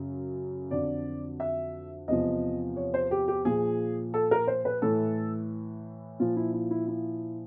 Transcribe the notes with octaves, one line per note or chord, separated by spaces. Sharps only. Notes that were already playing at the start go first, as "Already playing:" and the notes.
Already playing: F#2 C#3 F#3
F2 D3 F#3 D5
E5
E2 C3 F3 D#5
C#5
C5
G4
G4
A#2 F3 G#4
A4
A#4
C5
B4
A2 E3 A4
A#2 F3 F4
E4
E4
E4
E4